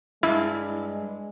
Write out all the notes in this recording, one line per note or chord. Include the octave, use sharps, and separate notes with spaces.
G2 G#3 E4